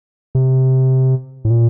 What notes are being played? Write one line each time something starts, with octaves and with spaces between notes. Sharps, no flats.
C3
A2
A#2